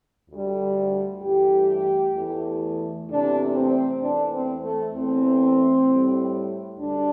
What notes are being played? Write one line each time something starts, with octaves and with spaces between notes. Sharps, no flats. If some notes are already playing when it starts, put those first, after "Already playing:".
D2 D3 G3
G2 E3 A3 G4
E2 E3 A3
E2 C3 A3 D4
C4
E2 E3 A3 D4
C4
A3
E2 E3 A3 C4
A2 G3
D2 D3 G3 D4